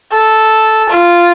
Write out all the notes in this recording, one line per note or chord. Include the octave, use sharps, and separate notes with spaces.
A4
F4